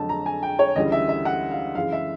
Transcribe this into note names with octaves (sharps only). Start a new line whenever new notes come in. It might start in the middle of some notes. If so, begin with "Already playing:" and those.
Already playing: F2 D3 F#3 A3 A5
A#5
G#5
G5
C#5
D2 C#3 E3 G3 D#5
E5
E5
F#5
F5
F#2 C#3 E3 G#3 F5
E5